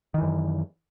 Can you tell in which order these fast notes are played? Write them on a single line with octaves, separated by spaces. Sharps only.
D#3 E3 F#2